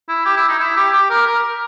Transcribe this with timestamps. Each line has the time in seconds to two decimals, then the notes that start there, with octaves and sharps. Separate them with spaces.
0.08 E4
0.25 G4
0.37 E4
0.48 D#4
0.59 E4
0.76 G4
0.93 G4
1.10 A#4
1.27 A#4